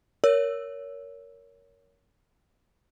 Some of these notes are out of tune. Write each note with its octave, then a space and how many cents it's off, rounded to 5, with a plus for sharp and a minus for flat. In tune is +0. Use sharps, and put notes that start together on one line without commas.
A#4 +0 C#5 +20 E6 +0